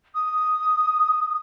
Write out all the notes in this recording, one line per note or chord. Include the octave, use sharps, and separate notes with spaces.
D#6